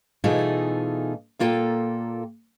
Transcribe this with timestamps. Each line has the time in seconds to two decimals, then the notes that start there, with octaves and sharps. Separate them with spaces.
0.24 B2 E3 A3 D#4 F4 G#4
1.39 A#2 A#3 F4 A4 G5